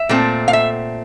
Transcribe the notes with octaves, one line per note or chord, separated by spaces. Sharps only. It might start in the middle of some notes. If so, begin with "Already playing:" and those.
Already playing: E5
A#2 A3 C4
F5
E5